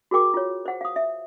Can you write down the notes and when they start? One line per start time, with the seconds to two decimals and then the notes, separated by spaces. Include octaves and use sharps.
0.11 F#4 G#4 A#4 G5 D6
0.34 F4 C#5
0.65 C5 F#5
0.81 F5 D#6
0.96 E5